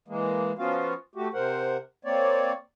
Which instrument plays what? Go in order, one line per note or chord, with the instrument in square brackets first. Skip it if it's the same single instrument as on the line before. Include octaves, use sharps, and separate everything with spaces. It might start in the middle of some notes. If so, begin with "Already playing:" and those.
[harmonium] E3 G#3 A#3
F3 B3 C#4 F4 F#4 F5
A3 F#4 G4
C3 A#4 C5 F#5
A#3 C4 C#5 D5